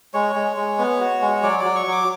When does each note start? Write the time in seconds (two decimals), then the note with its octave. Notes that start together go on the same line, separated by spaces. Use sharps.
0.14 G#3 C#5
0.36 G#3
0.57 G#3
0.79 B3
1.01 F#4
1.22 G#3
1.43 F#3 D5
1.59 D5
1.65 F#3
1.76 C#6
1.87 F#3 D6